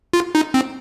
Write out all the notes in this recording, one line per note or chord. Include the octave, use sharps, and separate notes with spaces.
F4
D#4
C4